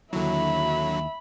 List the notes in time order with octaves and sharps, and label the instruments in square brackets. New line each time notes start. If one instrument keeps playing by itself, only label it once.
[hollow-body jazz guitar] D#2 E4 [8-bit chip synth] D3 F#3 [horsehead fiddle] E5 B5